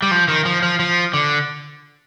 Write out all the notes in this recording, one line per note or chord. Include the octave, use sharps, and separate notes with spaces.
G3
F3
D#3
F3
F3
F3
D3